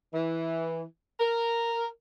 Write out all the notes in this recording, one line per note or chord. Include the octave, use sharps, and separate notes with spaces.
E3
A#4